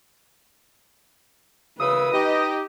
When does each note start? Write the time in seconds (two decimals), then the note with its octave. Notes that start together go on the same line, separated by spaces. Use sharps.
1.80 F#2 C#3 B4 D#6 E6
2.13 D#4 G4 D#5